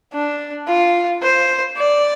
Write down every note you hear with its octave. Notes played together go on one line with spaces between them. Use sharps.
D4
F4
C5
D5